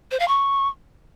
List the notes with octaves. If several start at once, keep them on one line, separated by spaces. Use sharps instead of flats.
C5
F5
C#6